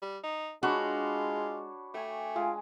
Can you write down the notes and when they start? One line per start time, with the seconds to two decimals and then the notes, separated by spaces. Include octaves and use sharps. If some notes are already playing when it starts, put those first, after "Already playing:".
0.02 G3
0.24 D#4
0.63 G#3 D4 F4 F#4 C#5 B5
1.94 A3 G5 G#5
2.36 G#3 F4